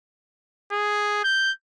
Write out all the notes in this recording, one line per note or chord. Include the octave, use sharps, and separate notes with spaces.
G#4
G6